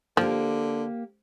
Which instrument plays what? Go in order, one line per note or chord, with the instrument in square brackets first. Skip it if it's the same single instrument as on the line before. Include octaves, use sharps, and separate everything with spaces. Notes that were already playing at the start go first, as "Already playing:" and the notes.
[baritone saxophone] D3 [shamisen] F3 [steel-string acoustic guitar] A#3 G4